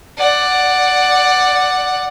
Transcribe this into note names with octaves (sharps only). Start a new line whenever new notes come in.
D5 F#5